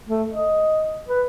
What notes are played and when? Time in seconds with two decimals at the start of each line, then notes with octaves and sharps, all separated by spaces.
0.09 A3
0.32 D#5
1.09 B4